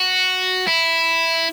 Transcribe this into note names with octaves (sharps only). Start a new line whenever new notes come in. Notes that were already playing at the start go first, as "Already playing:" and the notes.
Already playing: F#4
E4